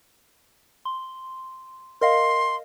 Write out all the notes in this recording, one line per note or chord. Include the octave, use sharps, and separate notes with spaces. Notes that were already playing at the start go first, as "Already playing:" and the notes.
C6
A#4 D#5 F5 C6